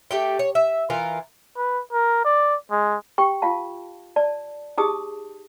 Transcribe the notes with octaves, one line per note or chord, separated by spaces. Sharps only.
A3 G4 G5
C#5
E5
E3 F4 A#4
B4
A#4
D5
G#3
G4 G5 C#6
F4 F5 A5
D5 A5
D#4 G4 G#4 A5 D#6